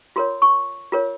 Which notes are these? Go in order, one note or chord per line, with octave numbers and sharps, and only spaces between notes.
F4 A#4 C#5 C6
C#6
F4 A#4 C#5